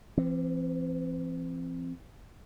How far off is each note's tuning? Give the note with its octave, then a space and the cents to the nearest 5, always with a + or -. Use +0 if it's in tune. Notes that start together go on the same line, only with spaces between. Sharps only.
E3 +45 C4 +0